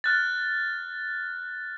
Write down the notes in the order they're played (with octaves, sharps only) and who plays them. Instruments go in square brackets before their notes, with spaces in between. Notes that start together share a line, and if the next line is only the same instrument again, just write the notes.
[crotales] F6 F#6 A6